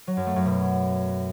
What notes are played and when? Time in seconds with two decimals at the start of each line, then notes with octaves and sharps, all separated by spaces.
0.07 F#3
0.17 F#2
0.26 A3
0.36 F#2
0.46 B2